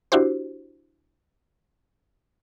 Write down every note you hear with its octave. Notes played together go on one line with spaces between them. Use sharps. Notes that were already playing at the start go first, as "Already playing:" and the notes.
D4 E4 F#4 G4 C5